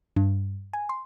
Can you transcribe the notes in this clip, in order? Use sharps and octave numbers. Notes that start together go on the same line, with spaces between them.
G2
G#5
C6